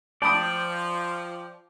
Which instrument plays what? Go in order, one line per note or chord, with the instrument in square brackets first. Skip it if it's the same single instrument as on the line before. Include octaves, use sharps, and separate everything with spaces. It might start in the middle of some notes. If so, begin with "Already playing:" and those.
[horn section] F3 [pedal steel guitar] D5 G5 [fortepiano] A5 B5 D#6